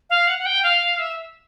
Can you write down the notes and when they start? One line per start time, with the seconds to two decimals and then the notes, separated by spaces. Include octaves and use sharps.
0.10 F5
0.27 F#5
0.38 F#5
0.46 G5
0.64 F5
0.99 E5